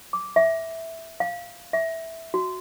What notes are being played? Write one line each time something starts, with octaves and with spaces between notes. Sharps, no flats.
D6
E5
F5
E5
F#4